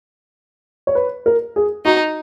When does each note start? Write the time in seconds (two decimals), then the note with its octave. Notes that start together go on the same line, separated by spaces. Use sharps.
0.87 C#5
0.95 B4
1.26 A#4
1.56 G#4
1.85 D#4 F#4